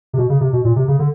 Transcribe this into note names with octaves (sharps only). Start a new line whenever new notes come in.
C3
B2
C#3
C3
B2
A#2
C3
C#3
D3